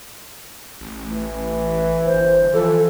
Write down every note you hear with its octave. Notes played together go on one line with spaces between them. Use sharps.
A1
E3
G1 C5
E3 F3 A4